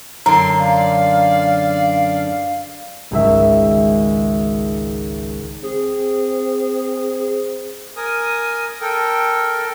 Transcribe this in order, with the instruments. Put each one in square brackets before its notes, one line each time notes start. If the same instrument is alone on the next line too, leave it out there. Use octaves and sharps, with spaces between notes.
[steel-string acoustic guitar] F#2 D3 [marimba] A#5 [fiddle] C6
[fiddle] D5 [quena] F5
[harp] G#1 C#2 E5
[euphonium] C4 [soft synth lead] G#4
[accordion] A#4 G#5 D#6
A4 A#4 G5